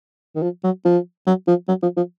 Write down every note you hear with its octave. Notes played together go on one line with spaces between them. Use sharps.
D#3
F3
F#3
F3
F#3
F3
F#3
F3
F3